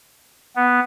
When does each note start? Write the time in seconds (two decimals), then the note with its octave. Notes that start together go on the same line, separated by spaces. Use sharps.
0.56 B3